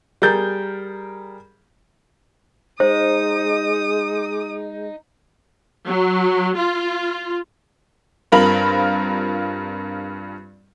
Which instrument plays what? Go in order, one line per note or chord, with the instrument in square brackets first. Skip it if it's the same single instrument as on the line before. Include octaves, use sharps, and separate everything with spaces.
[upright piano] G3 G#4 A#4 G6 A6
[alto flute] G#3 [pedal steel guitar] D#4 [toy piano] C5 [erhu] D#6
[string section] F#3
F4
[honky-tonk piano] G2 C4 F4 A#4 B5 F#7